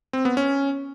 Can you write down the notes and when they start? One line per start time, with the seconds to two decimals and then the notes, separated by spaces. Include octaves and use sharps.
0.13 C4
0.25 B3
0.37 C#4